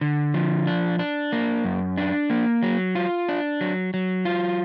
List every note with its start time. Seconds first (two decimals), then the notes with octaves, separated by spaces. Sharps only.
0.01 D3
0.34 F3
0.67 D4
0.99 D4
1.32 A#3
1.65 F#2
1.98 D4
2.30 A#3
2.63 F#3
2.95 F4
3.29 D4
3.61 F#3
3.94 F#3
4.25 F4